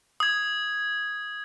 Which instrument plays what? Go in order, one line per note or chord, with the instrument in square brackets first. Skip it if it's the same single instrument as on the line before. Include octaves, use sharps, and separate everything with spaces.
[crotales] D#6 G#6